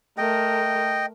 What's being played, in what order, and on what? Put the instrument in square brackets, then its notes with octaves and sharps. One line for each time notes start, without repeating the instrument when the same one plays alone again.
[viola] A3 A#4 [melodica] D#5 G5